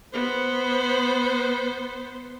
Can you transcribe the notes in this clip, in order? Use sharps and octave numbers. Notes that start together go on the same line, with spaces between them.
B3 C5